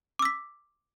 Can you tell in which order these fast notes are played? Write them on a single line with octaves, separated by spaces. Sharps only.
D6 E6 B6